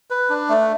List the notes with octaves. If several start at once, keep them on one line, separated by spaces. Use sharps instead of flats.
B4
D4
A3